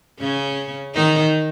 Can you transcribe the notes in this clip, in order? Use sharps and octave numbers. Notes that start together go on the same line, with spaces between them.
C#3 C#4
D#3 D#4